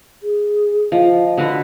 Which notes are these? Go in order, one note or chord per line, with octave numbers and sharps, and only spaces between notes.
G#4
F3 D#5
D3 F#4 B4